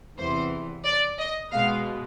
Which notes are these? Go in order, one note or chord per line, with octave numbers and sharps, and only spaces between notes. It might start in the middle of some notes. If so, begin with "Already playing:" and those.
E2 C3 E3 C5
D5
D#5
B2 G#3 B3 F5